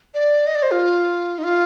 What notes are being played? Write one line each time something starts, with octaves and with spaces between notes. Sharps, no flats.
D5
D#5
D5
C5
F4
D#4
F4